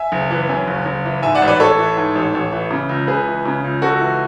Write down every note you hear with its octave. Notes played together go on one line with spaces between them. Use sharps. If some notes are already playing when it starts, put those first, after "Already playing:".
Already playing: E5 G#5
F#1
E3
F#2
F#1
F#1
E3
G#2 E5 G#5
D5 F#5
A1
B4 D5
A1 A4 C#5
E3
G#2
A1
A1
E3
C#3
C#2
C#2 G#4 B4
E3
C#3
C#2
C#2 F#4 A4
E3